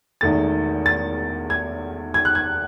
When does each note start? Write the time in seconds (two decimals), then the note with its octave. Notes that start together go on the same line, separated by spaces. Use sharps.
0.21 E1 E2 D#3 A3 A6
0.86 A6
1.50 G#6
2.14 G#6
2.25 F#6
2.35 G#6